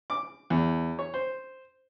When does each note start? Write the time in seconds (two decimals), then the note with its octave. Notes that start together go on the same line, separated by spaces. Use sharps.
0.10 D6
0.50 E2
0.99 C#5
1.14 C5